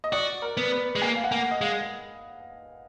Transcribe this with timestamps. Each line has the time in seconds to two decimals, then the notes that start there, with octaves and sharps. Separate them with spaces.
0.04 D#5
0.12 F#4 D5
0.42 A#4
0.57 B3
0.72 B4
0.95 G#3
1.02 A#3 G#5
1.16 F5
1.24 F#5
1.32 A#3 G#5
1.51 D#5
1.61 G#3 F5